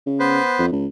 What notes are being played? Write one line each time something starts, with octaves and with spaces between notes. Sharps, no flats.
C#3
B3 B4 C5
F2
C#2